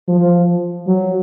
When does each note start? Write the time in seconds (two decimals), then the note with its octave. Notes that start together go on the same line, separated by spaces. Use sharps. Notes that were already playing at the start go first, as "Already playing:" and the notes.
0.08 F3
0.87 F#3